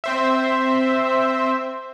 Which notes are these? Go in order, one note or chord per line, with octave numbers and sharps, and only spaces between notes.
C4 C5 E5